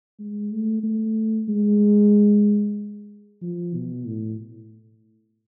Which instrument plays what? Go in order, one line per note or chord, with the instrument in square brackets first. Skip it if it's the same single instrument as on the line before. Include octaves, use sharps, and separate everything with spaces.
[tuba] G#3
A3
A3
G#3
F3
B2
A2